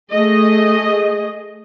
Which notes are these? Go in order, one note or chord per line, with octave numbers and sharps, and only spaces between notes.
A3 G#4 D#5